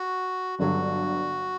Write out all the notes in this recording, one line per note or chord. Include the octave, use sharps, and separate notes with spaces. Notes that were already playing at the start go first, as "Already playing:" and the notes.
Already playing: F#4
G1 G2 D3 F#3 F#4